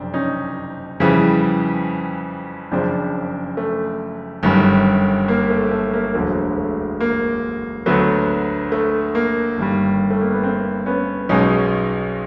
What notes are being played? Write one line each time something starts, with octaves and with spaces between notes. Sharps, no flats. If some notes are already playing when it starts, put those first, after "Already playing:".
Already playing: F#1 F2 C3 C4 D4
C#4 D#4
F2 C#3 E3 G3
F#1 F#2 C#3 F3 C4 D4
A3
G1 F#2 D#3 G3
A#3
A3
A3
A#3
E1 D2 D3 F#3 A3
A3
A#3
D2 D3 F#3 A3 B3
A3
A#3
G1 G2 D#3 G3
A3
A#3
B3
A#3 C4
B3 C#4
B1 B2 G#3 C#4 D#4